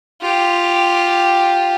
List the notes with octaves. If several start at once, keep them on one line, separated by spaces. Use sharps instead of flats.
F4 G4